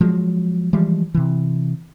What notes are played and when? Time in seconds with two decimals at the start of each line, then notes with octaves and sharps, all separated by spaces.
0.01 F3 F#3 G#3
0.73 E3 F3 G3 G#3
1.14 C3 E3